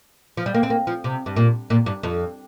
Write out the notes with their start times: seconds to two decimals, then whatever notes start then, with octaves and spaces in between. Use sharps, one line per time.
0.37 F3
0.46 G3
0.54 A#3
0.63 C4
0.70 A#3
0.87 F3
1.04 C3
1.26 G2
1.36 A#2
1.70 A#2
1.86 G2
2.03 F2